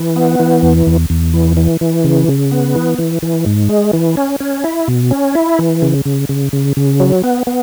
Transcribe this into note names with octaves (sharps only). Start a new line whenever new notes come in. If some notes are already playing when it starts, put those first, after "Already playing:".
Already playing: E3
B3
E3
E2
E2
E2
E3
E3
E3
C#3
C#3
B3
E3
E3
E3
G#2
G#3
E3
C#4
C#4
E4
B2
C#4
E4
E3
C#3
C#3
C#3
C#3
C#3
F#3
B3
B3